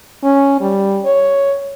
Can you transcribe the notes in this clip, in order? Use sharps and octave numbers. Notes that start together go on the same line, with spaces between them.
C#4
G3
C#5